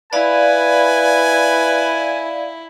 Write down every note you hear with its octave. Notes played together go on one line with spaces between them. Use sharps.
E4 B4 D5 F5 G#5